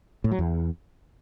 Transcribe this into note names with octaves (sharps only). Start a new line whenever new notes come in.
A2
F#3
E2